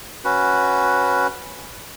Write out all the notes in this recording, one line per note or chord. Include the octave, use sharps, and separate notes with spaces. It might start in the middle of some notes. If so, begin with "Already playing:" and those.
C#4 F#4 B4